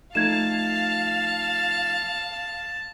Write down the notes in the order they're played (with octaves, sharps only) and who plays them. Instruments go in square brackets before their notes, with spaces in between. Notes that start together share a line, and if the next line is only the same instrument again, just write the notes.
[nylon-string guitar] F3 A3 D#4 [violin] F5 [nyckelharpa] A5 [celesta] G#6 E7